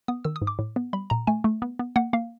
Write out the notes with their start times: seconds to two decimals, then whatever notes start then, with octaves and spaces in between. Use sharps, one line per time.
0.08 B3 D#6
0.25 D#3 E6
0.36 D#6
0.42 G#2
0.47 D6
0.59 A2
0.76 B3
0.93 G3 B5
1.10 A#2 A#5
1.27 A3 G#5
1.44 A3
1.62 B3
1.79 B3
1.96 A#3 F#5
2.13 A#3 F5